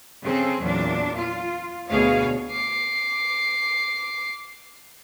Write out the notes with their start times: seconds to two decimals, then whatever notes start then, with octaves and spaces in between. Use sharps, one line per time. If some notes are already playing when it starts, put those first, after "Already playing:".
0.23 C#3 C4 G#4 A4
0.60 E2 A#2 F#3 D4
1.15 F4
1.90 D2 B2 G#4 C#5 F5
2.51 D6 C7